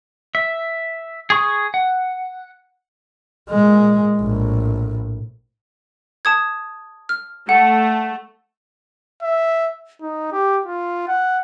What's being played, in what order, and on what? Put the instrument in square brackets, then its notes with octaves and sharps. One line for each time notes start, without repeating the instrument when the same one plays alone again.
[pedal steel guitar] E5
G#4 C#6 D#6
F#5
[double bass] A#2 G#3
A#1 A2
[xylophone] A5 D#6 G#6
F6
[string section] A3 [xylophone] F#5
[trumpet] E5
D#4
G4
F4
F#5